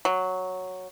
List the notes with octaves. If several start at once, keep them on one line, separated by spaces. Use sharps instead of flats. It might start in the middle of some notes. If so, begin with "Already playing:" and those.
F#3